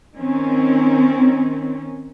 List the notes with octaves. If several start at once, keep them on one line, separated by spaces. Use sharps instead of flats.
D#3 C4 C#4